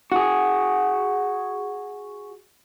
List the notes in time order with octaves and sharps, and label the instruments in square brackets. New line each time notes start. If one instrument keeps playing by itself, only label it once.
[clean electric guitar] F#4 G#4